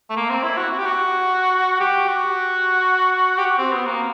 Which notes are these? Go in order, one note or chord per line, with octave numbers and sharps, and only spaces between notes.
A3
A#3
C4
E4
F#4
F#4
G4
F#4
G4
F#4
G4
F#4
C4
B3
A#3